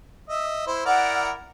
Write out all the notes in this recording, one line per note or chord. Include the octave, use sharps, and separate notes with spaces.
D#5 E5
E4 C5
E4 A#4 D5 F#5